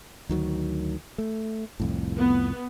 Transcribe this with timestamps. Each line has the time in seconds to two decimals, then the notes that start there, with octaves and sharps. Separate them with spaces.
0.29 D2 D#3 F#3
1.18 A3
1.80 C2 F2 A2
2.17 B3